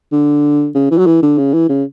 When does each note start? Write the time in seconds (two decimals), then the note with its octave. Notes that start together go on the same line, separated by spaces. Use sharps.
0.12 D3
0.75 C#3
0.91 E3
0.98 F#3
1.06 E3
1.22 D3
1.38 C#3
1.54 E3
1.70 C#3